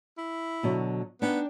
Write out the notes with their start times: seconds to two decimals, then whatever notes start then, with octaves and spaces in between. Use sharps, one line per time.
0.18 E4
0.63 B2 D3 F#3
1.22 B3 D4 D#4 G5